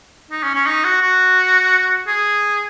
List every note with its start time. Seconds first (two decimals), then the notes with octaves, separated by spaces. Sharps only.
0.31 D#4
0.43 C#4
0.55 C#4
0.66 D#4
0.84 F#4
1.02 F#4
2.07 G#4